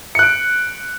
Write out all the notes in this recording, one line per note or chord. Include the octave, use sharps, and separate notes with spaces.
F#6 C#7 D7